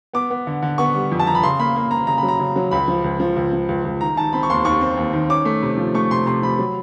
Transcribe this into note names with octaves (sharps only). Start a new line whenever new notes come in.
B3 D6
B3
D3
D3
B3 C#6
G3
F2
A5
F2 A#5
B5
C#3 C6
A#3 B5
A#3
A#3 A#5
C#3 A#5
B5
F#3
A#5
C#3
F#3
C#2 B5
F3
C#2
F3
C#2
F3
C#2
C#2
D#3 A#5
D#3 A5
C4 B5
C#6
D#2 C6
D#2 C#6
C4
D#2
D#3
C#4 D6
A3
C3
F3
A3 C#6
C3 C6
C3 C6
F3 B5
F#3